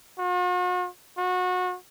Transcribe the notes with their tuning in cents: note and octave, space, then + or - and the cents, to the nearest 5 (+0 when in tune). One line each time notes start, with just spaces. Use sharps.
F#4 -45
F#4 -25